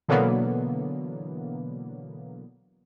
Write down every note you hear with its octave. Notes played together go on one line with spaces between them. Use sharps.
B2 D3 E3 F#3 A#3 B3